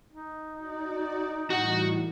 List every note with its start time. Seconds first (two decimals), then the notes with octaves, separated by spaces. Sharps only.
0.12 D#4
0.57 F#4 D5
1.50 A2 E3 G3 F#4 F#5